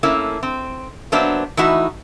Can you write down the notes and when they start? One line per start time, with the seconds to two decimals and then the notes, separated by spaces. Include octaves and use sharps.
0.03 A3 A#3 C#4 E4
0.43 C4
1.12 F#3 A#3 B3 D4 C5 E5
1.57 E3 A3 D#4 E4 F#4